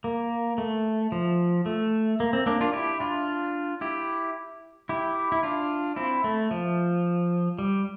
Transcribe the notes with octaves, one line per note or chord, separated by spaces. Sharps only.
A#3
A3
F3
A3
A#3
C4
A#3 D4
D4 F4
E4 G4
D4 F4
E4 G4
E4 G4
E4
D4 F4
C4 E4
A3
F3
G3